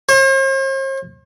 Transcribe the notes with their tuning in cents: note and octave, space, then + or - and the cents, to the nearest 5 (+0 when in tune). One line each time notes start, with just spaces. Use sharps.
C5 +45